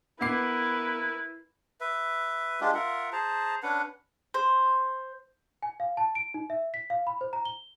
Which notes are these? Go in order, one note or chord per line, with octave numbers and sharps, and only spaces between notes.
B3 E4 A#4 B4 D6 C7
B4 E5
G#3 D4 F4 G4
F4 A#4 E5 F#5
G#4 C5 A5 A#5
C#4 D4 B4 F#5
C5
G#5
F5
A5
D7
D#4
E5
B6
F5
B5
C5
A#5
G7